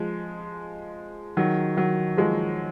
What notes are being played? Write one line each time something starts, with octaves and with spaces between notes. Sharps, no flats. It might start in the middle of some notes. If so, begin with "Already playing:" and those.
Already playing: F3 G#3
D#3 F#3
D#3 F#3
F3 G#3